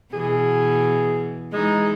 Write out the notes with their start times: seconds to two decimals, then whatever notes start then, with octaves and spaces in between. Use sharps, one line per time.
0.13 B2 E3 G#4
1.53 E3 G#3 D#4